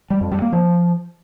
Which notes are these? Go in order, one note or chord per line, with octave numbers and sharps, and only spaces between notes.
G3
F2
G3
A#3
F3